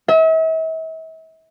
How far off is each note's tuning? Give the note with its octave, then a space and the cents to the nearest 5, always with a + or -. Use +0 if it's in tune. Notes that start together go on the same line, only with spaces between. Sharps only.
E5 -40